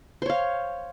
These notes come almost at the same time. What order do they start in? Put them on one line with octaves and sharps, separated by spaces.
C5 C#5 F5